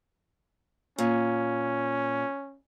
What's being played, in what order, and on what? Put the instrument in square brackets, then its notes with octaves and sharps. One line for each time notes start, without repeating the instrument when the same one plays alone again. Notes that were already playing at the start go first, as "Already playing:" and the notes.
[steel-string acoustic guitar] A#2 [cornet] C#4